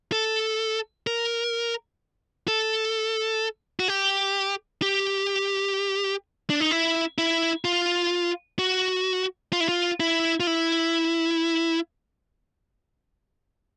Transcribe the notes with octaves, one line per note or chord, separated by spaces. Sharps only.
A4
A#4
A4
F#4
G4
G4
D4
D#4
E4
E4
F4
F#4
F4
E4
F4
E4
F4
E4